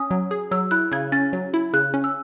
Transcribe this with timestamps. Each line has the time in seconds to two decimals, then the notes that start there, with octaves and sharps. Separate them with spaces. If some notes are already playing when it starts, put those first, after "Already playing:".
Already playing: C#4 D#6
0.11 F#3
0.31 G#4
0.51 F#3 E6
0.71 E4 F#6
0.92 C#3 G#6
1.12 C#4 A6
1.33 F#3
1.54 E4
1.73 C#3 F#6
1.94 C#4
2.04 E6